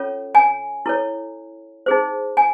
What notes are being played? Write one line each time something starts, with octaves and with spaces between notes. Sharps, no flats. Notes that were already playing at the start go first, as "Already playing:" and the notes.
Already playing: C#4 F4 A4 C#5
G#5
E4 A4 C#5
D#4 G#4 C5
G#5